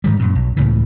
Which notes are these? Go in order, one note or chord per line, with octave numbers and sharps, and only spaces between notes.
G#2 D#3 G3
F#2 A#2
B1
C#2 A2 C#3 E3